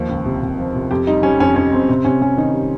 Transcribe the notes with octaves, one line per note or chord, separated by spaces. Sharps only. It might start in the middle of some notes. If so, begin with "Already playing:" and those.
Already playing: D#2 F3
C#2
C3
C3
F3
C3
F2 G4
G3 D#4
G3 C#4
F2 C#4
F2 C#4
F2 C4
C3 C4
C3 C#4
C3 C#4
D#3 D#4
G3